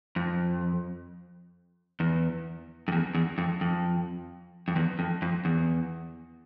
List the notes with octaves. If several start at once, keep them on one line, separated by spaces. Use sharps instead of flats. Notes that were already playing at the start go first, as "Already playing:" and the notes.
F2
E2
F2
E2
E2
F2
F2
F2
E2
F2
F2
E2